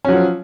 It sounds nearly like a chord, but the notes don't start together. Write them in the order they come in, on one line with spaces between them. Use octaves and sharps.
C#4 F#3 F3